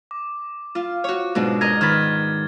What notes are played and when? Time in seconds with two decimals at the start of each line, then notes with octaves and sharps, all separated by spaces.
0.11 D6
0.75 F4
1.04 F#4 C#5
1.35 G#2 B2 D4
1.61 A#4 D#5 G#6
1.81 D#3 B4 F6 G#6 A6